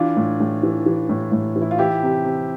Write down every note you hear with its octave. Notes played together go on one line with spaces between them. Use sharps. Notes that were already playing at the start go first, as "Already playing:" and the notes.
Already playing: E3 D4 F4
A2
A2
E3
E3
A2
A2
E3
E4
F4
E3 E4 G4
C3
C3